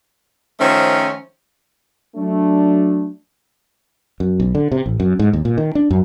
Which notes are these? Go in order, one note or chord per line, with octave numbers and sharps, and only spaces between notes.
D#3 F3 A3 C#4 C5
F#3 A3 D4
F#2
B1
D3
C3
A1
F#2
G#2
D#2
A#2
D#3
D4
F#2